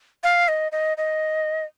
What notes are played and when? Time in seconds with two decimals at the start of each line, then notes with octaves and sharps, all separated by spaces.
0.23 F5
0.48 D#5
0.72 D#5
0.97 D#5